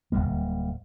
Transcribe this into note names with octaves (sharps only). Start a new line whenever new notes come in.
D1 G#1 G3 A#3